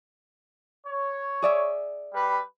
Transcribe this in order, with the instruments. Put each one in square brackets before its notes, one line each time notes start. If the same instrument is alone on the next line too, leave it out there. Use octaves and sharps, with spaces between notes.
[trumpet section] C#5
[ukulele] G#4 D5 E5
[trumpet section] G3 B4